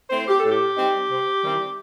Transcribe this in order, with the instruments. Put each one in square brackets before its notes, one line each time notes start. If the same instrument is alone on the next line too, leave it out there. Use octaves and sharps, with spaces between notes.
[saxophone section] A3 C4 E4 C5
G4
A2 A4
G4
G3 C4 D#4
C3
D#3 G3 C4 E4